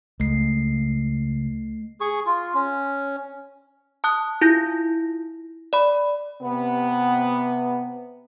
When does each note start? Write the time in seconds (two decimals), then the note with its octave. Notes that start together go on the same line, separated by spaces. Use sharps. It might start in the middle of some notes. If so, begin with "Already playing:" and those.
0.20 C#2 A3 C7
2.01 G#4 C#6
2.26 F4
2.54 C#4
4.04 A5 D#6 F#6
4.41 E4 F4 G6 A#6
5.73 D5 B5
6.42 C3 B3